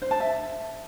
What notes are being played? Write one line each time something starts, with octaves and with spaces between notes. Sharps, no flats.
C5
A5
E5